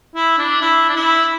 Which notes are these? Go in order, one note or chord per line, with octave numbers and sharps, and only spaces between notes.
E4
D4
E4
D4
E4